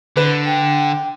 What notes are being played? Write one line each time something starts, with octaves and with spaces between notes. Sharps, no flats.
D3 B4
G5